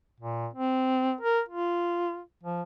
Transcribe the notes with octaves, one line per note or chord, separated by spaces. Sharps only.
A#2
C4
A#4
F4
F3